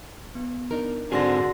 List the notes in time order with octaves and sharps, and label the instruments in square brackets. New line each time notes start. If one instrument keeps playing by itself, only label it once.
[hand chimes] B3
[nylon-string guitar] D4 D#4 A#4
[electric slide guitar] G#2 C4 G#4 [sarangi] D3 [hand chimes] F#4 C6 A#6